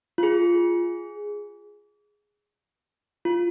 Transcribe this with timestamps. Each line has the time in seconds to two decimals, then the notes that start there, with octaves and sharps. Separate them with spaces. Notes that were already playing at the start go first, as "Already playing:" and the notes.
0.18 F4
0.23 G#4
3.25 F4